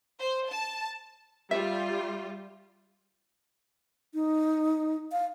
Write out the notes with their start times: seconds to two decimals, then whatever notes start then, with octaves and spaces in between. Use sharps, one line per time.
0.19 C5
0.49 A5
1.51 G3 F4 E5
4.14 D#4
5.12 F5